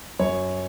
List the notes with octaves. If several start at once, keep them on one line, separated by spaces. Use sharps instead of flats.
F#2 C#5